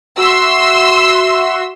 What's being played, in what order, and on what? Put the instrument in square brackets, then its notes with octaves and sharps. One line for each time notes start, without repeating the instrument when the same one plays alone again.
[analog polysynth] F#4 E5 [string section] C6 E6